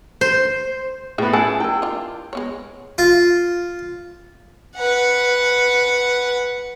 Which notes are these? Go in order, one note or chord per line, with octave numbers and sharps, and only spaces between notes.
C5
A2 B3 G#4 E5 G5
C#4 G#4 F#5 G#5 A5 E6
E4 A#4 G5
D4 F4
G#3 B3 C#5
F4
B4 F#5